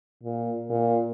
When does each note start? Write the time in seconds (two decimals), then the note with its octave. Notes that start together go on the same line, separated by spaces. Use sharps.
0.23 A#2
0.70 A#2